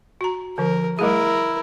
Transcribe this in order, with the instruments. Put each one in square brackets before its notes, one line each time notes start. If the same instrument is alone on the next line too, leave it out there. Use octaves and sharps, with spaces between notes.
[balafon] F#4 A#5
[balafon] D3 F3 [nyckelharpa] A#4
[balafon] G3 A3 G#4 [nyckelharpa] E4 A#4